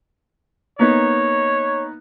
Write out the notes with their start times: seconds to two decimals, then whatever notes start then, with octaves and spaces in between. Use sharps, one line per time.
0.79 A#3 B3 D#4 C#5